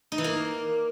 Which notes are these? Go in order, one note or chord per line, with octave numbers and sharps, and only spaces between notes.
D#4
E3
A#3